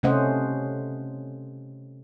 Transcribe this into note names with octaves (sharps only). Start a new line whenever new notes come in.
C3 A3 C#4 C5 D#5 F#5